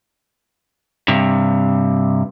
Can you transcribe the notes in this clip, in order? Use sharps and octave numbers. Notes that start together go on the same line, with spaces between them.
G2 C3